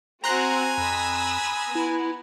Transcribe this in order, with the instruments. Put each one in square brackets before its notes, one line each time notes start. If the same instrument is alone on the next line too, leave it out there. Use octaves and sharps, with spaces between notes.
[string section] C4 F#4 [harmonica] G#5 [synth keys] A#5 C6 F#6
[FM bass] F2 [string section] B5 D#6 E6
[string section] B3 [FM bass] E4